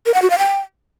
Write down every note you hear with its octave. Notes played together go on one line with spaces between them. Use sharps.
A#4
F#5
F#4
F5
G5